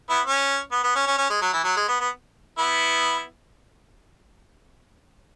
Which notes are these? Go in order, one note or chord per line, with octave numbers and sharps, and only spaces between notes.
B3 E4
C#4
B3
B3
C#4
C#4
C#4
G#3
F#3
E3
F#3
G#3
B3
B3
B3 E4